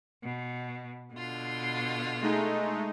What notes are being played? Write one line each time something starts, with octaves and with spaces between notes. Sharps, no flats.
B2
B2 D3 F4
G#3 A3 D#4